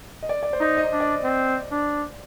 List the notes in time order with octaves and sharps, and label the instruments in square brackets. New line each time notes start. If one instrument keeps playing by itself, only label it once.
[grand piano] D#5
D5
D5
C5
[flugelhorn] D#4
[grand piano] D#5
[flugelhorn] D4
[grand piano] D5
[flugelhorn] C4
D4